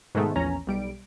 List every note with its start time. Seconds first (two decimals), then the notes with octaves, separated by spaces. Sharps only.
0.15 G#2 B2 D#3 G#3 A3
0.36 A#1 E2 C#4 A#5
0.67 B1 G3 D7